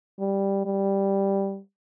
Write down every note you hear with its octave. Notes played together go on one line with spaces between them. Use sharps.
G3
G3